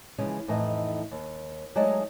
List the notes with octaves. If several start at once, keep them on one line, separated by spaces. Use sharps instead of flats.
C#3 E3 F3 G#3 C#4
F2 A2 E3 D#4 D#5
D#2
F#3 G#3 A3 D#4 D5 D#5